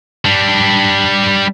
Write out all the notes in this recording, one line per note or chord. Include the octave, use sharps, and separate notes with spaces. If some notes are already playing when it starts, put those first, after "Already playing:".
G3 D4